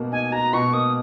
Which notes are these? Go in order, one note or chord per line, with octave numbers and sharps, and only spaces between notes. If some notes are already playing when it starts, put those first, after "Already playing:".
Already playing: B2 A#3 F#4
D#4 G#5
F#4 A#5
B2 C#6
A#3 D#6